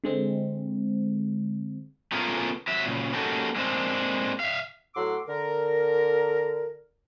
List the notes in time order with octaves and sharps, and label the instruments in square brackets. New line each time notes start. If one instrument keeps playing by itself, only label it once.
[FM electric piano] D3 G#3 C4
[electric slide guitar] A3 B3 C#4 F4 G#4 A#4
F#3 E5
A#2 C#3
A#3 C#4 D#4 F#4 G4 A4
G#3 A#3 C4 D4
E5 F5
[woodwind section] A2 F#3 F#5 C6 D6 E6
D3 A#4